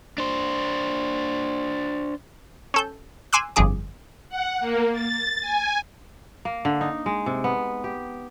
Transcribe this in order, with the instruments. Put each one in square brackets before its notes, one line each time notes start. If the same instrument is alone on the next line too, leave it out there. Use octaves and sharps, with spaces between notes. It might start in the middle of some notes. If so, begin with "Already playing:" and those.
[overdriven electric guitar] D4 C5
[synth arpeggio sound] C#4 A4 G6
G#5 C6 D6 E6 F#6
G1 F2 F3 G#4 D6
[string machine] F#5
A#3
A6
G#5
[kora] A#3
D3
D#4
G#3
C3
B3
G4